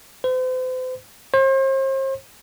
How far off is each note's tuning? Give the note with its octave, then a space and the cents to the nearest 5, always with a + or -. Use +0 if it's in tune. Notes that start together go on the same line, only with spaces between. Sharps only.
C5 -40
C5 +40